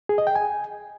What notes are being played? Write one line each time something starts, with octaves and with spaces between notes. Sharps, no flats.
G#4
D#5
G5
G#5